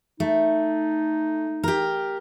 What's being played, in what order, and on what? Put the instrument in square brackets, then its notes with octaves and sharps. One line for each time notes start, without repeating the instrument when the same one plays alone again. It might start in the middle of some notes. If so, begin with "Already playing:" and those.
[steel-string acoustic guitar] A3 [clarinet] D#4
[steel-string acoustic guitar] G4 A#4